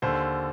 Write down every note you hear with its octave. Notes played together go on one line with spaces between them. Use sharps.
D#2 D3 C5